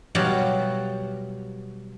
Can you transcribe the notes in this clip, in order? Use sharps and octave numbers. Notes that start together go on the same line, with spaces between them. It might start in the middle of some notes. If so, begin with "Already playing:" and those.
B2 F#3 G3 G4 F5 F#5